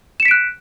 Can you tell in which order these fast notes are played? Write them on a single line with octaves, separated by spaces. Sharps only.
E7 C#7 B6 D7 F#6